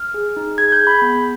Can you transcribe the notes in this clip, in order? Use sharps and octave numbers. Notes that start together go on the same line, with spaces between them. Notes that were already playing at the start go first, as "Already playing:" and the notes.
Already playing: F6
G#4
D#4
G#4 G#6
G6
G#4
B5
B3